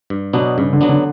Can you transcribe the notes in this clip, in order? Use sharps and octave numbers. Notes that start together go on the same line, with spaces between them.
G2
B2 F#3 B3 D4
G2 C#3
D3
F#3 B3 D4
D3